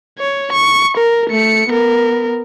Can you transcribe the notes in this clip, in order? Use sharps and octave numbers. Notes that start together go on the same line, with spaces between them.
C#5
C#6
A#4
A3 C#7
B3 A#4